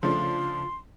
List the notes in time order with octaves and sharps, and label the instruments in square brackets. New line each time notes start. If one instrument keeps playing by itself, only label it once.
[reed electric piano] C#3 [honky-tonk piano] F3 A3 D4 [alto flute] F4 [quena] C6